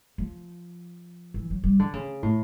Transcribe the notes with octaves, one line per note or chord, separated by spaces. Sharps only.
F3
E3
F#3
G3
D3
C#3
A2